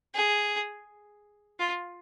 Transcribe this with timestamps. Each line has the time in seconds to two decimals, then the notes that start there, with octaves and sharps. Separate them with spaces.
0.14 G#4
1.59 F4